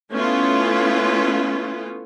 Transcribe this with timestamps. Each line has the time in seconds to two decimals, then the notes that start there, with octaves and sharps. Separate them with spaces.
0.11 A3 B3 C#4 E4 F4